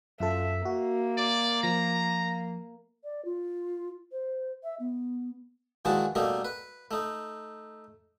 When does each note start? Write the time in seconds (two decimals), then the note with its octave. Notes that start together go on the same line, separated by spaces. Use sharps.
0.20 F#2 F4 A4 E5
0.65 A#3 F#4
1.17 D5
1.63 F3 A#5
3.04 D5
3.25 F4
4.12 C5
4.63 E5
4.80 B3
5.85 A#2 D#3 E3 G#3 F#4 A5
6.15 B2 G3 A3 A#3 D#4
6.45 B4
6.91 A3 D#4